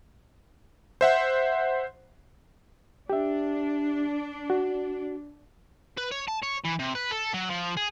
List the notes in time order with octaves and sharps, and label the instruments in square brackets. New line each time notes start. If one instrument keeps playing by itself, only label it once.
[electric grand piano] C5 E5 F#5
[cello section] D4 [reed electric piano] G4 E5
[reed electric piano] F#4
[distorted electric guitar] B4
C#5
A5
C#5
E3
C3
B4
A4
F#3
F3
G#4